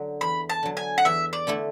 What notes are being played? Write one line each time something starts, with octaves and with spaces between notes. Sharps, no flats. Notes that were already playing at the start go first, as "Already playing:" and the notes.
Already playing: D3 F#3
E2 B5
A5
D3 F#3
G#5
F#5
E2 E5
D5
D3 A3 E4 A4